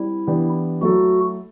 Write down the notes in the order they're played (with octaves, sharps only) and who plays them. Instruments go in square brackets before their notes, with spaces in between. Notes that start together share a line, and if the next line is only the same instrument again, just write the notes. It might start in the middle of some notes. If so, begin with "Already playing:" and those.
Already playing: [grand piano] G3 C4 [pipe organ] E4
[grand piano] E3 B3 D4 G4
[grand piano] F#3 A3 E4 A4 [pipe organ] F#4